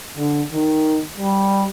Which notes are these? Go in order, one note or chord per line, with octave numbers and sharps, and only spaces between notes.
D3
D#3
G3